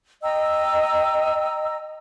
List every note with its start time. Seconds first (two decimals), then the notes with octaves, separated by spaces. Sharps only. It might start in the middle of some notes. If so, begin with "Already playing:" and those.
0.23 D#5 G5 A#5 E6